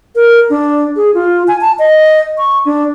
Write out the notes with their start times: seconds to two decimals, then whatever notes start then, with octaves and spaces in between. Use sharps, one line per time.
0.15 A#4
0.50 D4
0.96 G#4
1.14 F4
1.48 G#5
1.61 A5
1.79 D#5
2.38 C#6
2.65 D4